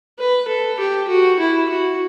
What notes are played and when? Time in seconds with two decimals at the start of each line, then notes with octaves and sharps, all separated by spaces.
0.19 B4
0.48 A4
0.79 G4
1.08 F#4
1.39 E4
1.69 F#4